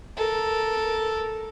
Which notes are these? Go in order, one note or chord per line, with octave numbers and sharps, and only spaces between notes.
A4 A#4